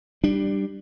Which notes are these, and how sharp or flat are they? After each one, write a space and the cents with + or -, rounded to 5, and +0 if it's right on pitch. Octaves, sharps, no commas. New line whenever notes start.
G3 +0 D4 +15